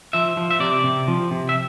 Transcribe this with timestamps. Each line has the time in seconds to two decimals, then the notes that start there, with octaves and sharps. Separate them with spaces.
0.13 F3 E5
0.37 F3
0.51 E5
0.60 C3 D5
0.84 C3
1.08 F3
1.31 C3
1.49 E5